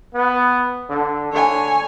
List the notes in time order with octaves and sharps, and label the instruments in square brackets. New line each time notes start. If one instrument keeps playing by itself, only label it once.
[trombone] B3
D3
[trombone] D3 [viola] C#5 G#5